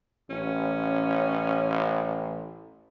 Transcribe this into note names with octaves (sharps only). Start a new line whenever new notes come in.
A1 C#4